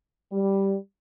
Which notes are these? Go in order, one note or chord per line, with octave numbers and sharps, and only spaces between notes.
G3